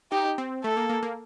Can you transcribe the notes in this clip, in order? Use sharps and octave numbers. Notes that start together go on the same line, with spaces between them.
D#4 G4
C4
A3 A4
A#3
A#3
A#3